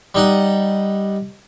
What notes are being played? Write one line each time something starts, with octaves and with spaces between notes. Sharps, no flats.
G3 D#4 F#5